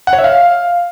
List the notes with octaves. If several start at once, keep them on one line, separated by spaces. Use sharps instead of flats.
F#5
C#5
E5
F5